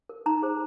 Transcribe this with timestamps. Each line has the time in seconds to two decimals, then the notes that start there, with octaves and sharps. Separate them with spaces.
0.09 A#4
0.26 D#4 A#5
0.42 G#4 C5